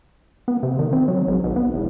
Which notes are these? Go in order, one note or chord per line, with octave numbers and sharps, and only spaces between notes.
B3
C3
D#3
C4
F#3
G#1
B1
B3
E1